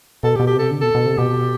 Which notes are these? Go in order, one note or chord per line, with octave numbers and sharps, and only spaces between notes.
B2 A4
G4
B2
G4
C3 A4
D3
B2 A4
B2
C3
B2 G4